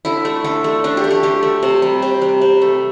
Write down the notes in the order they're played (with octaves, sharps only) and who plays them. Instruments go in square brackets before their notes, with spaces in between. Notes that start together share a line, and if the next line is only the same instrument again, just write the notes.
[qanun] D3 E4
A3
D3 A4
A3
D3 D4
G4
A3
G4
D3 G4
A3
C3
G3
C3 G4
G3
C3
A3